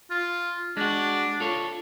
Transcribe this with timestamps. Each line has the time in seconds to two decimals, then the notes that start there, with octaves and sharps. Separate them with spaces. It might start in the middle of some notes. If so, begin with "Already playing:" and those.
0.10 F4
0.77 G#3 D4 F#4
1.40 F4 A4 C#5